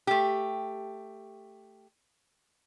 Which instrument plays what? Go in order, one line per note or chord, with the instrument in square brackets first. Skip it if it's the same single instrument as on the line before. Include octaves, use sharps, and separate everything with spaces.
[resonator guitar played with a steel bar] A3 G4